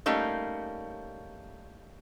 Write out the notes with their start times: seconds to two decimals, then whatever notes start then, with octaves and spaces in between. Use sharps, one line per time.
0.06 G3 A3 A#3 C#4 D#4